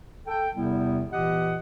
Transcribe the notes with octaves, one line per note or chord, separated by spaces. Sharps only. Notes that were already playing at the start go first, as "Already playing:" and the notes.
A4 G5
E2 C3 G3 B3 E4
A#2 E3 G4 D#5 F#5